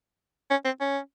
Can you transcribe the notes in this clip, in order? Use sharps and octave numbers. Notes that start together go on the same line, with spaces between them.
C#4
C4
C#4